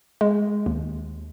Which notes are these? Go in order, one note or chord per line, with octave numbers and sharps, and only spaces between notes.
G#3
D#2